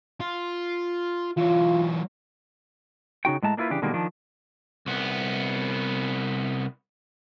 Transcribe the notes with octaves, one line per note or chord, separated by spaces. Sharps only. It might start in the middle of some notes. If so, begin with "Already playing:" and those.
F4
E3 F#3 F4
C#3 D#4 F#4 G5
A2 G#3 A5 A#5
A#3 D4 E4 F4 B4
C#3 E3 D4 G4
B2 D3 D#3 G3 G#3 A#3
D#3 F3 D4
C2 B3